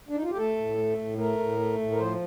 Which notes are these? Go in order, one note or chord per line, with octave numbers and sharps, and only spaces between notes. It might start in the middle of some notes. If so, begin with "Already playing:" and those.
D4
D#4
F4
G4
A3 A4
A2
A3
A2
A3 A#4
A2
A3
A2
A#4
F3 C5